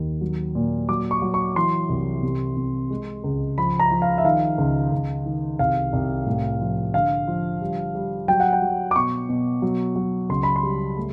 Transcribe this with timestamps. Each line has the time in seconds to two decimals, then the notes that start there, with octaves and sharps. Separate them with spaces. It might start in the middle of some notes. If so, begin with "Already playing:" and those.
Already playing: D#2
0.21 F#3
0.55 A#2
0.89 F#3 D6
1.11 C#6
1.22 F#3
1.34 C#6
1.55 E3 C6
1.89 C2
2.23 C3
2.57 C3
2.90 G#3
3.24 C#2
3.58 F3 B5
3.80 A#5
3.91 F3
4.02 F5
4.18 E5
4.24 D#3 F5
4.58 C#2
4.92 C#2
5.26 D#3
5.59 C2 F5
5.93 C2
6.27 A2
6.61 F3
6.94 D3 F5
7.27 F3
7.61 G3
7.95 G3
8.28 F#3 G5
8.40 F#5
8.53 G5
8.62 F#3
8.91 D6
8.96 B2 C#6
9.29 B2
9.62 F#3
9.96 F#3
10.29 C#2 C6
10.43 B5
10.56 C6
10.63 G3
10.97 A3